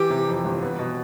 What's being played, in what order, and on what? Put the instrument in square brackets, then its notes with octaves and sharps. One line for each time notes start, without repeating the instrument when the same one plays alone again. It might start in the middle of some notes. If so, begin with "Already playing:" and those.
Already playing: [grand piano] E3 [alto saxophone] G4
[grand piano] C3
F2
G1
B3
B2